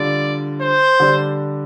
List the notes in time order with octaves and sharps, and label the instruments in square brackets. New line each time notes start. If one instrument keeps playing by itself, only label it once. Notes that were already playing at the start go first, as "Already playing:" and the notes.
Already playing: [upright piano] D3 G3 F4 [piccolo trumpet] D5
[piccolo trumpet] C5
[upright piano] D3 G3 D4